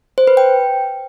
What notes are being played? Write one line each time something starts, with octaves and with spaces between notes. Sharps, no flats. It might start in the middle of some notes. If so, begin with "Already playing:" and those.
C5
B4
G5